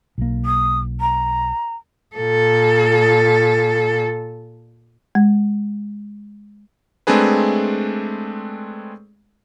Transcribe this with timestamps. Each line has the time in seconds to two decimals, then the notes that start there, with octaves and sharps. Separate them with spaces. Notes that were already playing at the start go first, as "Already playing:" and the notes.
0.18 B1 A#3
0.45 D#6
1.00 A#5
2.16 A#2 A4
5.15 G#3
7.07 G#3 A3 C4 D4 G#4 B4